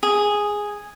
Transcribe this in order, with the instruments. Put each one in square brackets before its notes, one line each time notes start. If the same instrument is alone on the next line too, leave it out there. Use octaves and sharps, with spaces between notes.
[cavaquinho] G#4